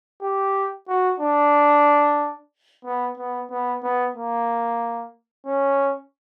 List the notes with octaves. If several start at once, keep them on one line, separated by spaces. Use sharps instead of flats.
G4
F#4
D4
B3
B3
B3
B3
A#3
C#4